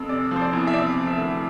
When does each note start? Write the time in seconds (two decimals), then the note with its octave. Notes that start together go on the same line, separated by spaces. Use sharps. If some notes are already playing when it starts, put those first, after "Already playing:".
Already playing: F2
0.09 C3 D5
0.31 F3 C5
0.41 D5
0.53 E2
0.67 E5
0.74 C3 D5
0.96 F3
1.07 E5
1.17 D2